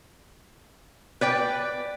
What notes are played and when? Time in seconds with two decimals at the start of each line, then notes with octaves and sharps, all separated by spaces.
1.21 B4 D5 G5